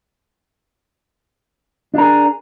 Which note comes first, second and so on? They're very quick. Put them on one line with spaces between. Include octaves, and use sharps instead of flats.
D4 A#4 G#4